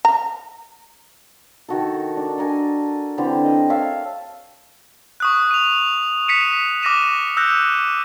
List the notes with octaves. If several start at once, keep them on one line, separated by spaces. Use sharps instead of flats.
A#5
D#3 F#4 A4
D4
A4 A#4 G#5
D3 E3 C4 G4
D#5
A4 C#5 E5 F5
C#6 D#6 F#6
D#7 F7
B6 C#7 D#7 E7
D6 F6 A#6 B6 D#7 E7
E6 F#6 G6 A#6